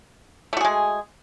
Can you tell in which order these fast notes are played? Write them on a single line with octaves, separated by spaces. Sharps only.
A3 F#4 G#4 G#3